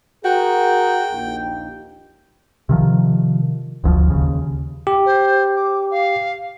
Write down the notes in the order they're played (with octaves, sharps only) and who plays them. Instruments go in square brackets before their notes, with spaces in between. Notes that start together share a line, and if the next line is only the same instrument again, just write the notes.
[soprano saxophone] F#4 [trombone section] G#4 A#4 [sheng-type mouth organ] G5
[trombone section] A#1 D#2
[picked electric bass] C3 D#3 F3
F#1 D2 C#3 F3
D#2 C#3
[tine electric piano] G4
[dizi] C5
D6
F5